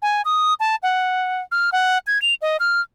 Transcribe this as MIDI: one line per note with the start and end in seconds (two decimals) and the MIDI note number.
0.02 0.22 80
0.25 0.54 87
0.60 0.76 81
0.83 1.41 78
1.52 1.70 89
1.72 1.98 78
2.07 2.20 92
2.22 2.34 101
2.42 2.57 75
2.60 2.81 89